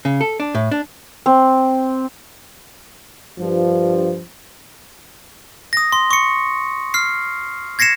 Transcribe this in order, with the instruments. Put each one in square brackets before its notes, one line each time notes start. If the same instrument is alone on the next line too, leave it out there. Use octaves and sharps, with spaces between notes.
[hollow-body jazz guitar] C#3
A4
D4
A2
D4
[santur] C4
[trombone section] G2 F3
[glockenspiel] D#6 A#6
C6
C#6 C#7
F6 C7
G#6 A#6 C7 C#7 E7